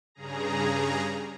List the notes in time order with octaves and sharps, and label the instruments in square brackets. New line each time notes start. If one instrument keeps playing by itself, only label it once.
[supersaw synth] G2 C#3 G#4 A#5